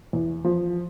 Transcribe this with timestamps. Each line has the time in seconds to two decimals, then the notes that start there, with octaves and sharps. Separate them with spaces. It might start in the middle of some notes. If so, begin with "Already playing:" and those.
0.13 E2
0.44 F3